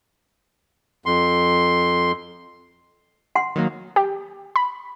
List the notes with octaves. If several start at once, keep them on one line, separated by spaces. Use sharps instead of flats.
F2 C6
F#5 C6
D#3 F#3 A#3
G4
B5